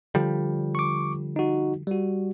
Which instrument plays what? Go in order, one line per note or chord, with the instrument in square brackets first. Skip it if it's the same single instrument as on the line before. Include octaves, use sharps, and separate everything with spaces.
[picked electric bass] D3 F3 G3
[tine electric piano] C#6 D6
D#4 F#4
G3 F#4